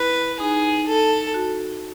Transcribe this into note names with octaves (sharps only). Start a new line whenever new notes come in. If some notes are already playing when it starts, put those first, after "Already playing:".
Already playing: E4 B4
D#4 G#4
A4
F#4